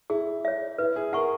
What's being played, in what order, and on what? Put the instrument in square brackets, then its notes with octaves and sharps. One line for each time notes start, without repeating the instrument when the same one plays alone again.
[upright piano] E4 [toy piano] G#4
[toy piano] C#5 E5
[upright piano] E4 [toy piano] B4
[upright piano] G#4
[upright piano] A#4 [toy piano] F#5 C#6